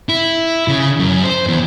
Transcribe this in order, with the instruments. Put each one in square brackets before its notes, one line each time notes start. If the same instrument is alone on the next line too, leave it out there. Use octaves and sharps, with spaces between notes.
[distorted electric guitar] E4
C#3
F#2
C5
E2